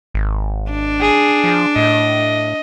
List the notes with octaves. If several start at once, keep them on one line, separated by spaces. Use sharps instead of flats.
G#1
D4
G#4
F3
A2 D#5